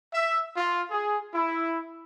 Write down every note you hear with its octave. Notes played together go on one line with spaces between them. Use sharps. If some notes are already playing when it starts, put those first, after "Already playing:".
E5
F4
G#4
E4